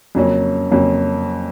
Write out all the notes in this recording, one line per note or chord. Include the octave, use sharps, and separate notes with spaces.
F2 C#3 F#3 A#3 C#4
F2 C#3 F#3 A#3 C#4